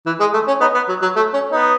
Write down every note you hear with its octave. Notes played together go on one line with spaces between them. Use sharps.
E3
G#3
A3
C#4
B3 D#4
B3
F#3
F#3
A3
C#4
B3 D#4